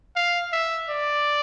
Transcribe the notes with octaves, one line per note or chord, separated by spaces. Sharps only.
F5
E5
D5